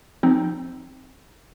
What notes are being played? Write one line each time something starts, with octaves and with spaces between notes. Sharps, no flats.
F3 C4 D#4